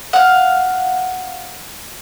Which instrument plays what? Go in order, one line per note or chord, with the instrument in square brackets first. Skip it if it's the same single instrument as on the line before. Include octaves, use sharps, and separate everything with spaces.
[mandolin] F5 F#5